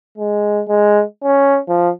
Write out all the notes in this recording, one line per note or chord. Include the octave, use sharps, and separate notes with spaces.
G#3
G#3
C#4
F3